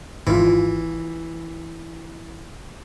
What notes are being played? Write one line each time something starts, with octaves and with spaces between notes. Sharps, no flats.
G#1 E3 F4